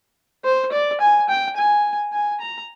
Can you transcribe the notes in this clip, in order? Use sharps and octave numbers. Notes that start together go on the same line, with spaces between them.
C5
D5
G#5
G5
G#5
G#5
A#5